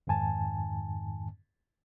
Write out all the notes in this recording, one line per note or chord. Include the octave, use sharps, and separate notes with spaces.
F2 G#2 D#3 G#5 A5